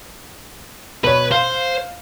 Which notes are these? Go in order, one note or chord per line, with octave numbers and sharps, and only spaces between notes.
B2 B4 C#5
C5 F5